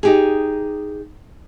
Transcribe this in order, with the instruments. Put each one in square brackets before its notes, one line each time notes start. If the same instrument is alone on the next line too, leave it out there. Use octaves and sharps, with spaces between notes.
[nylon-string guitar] D#4 G4 G#4